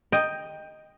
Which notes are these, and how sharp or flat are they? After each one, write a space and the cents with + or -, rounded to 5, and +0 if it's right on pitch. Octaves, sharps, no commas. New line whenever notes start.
D#5 +0 G5 +10